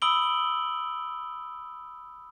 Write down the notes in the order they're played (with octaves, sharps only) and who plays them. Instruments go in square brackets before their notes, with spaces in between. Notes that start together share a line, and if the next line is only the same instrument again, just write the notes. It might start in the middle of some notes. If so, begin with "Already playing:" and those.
[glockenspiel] B5 D#6 E6 D7 F#7 G7